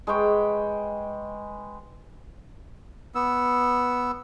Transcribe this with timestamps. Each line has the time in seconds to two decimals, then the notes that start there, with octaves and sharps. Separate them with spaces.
0.07 G#3 B4 G5 C#6
3.15 B3 E6